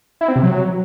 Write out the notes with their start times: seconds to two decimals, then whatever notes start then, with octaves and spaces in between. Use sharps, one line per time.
0.21 E4
0.28 C4
0.36 C3
0.43 F#3